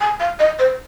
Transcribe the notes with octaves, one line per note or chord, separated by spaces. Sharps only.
G#5
F5
D#5
C5